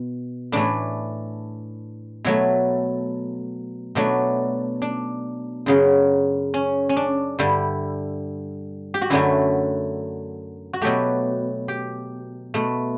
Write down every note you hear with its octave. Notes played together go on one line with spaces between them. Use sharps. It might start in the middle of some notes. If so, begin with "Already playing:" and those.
Already playing: B2
A2 E3 A3 D4
B2 F#3 A3 E4
B2 F#3 A3 D4
D4
F#2 C#3 F#3
C#4
C#4
D4
G2 D3 G3 E4
G4
F#4
F#2 D3 F#3 A3 E4
F#4
B2 F#3 A3 G4
G4
B2 A3